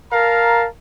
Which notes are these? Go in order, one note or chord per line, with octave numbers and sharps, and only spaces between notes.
A#4 F5 A5 A#5